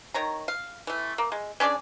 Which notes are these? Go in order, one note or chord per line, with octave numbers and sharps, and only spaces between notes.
D#3 C#5 A#5
F5
E3 A3
A#3
G#3
C#4 D4 G#4 D5